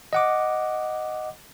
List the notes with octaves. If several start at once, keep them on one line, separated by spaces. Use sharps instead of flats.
D#5 F#5 D6